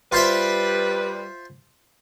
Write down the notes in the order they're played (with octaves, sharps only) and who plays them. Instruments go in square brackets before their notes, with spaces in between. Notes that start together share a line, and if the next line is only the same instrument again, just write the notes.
[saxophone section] G3 B4 [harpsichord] F4 C5 E5